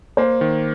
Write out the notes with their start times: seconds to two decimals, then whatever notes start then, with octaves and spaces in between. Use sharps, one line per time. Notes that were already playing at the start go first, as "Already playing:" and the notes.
0.17 A#3 C5
0.41 D#3